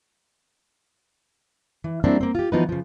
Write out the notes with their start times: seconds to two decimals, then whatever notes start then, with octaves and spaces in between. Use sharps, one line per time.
1.84 E3
2.04 G3 A#3 C4 D4 E4 F#4
2.21 A#3 C4
2.35 F4 G4
2.52 E3 F3 B3 D#4 F#4 B4
2.69 C#3 F3